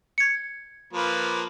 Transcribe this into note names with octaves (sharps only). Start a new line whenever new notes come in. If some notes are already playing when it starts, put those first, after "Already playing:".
G#6 C#7
F3 A#3 B4